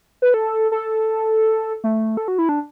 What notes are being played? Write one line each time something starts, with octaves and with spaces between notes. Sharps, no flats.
B4
A4
A4
A3
A4
F#4
E4
D4